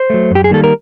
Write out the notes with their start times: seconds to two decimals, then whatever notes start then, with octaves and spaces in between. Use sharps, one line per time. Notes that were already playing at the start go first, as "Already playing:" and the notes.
Already playing: C5
0.10 F#3 A3
0.31 F#2 G4
0.44 G#4
0.51 D#3 G3 A#3 A4
0.64 A#4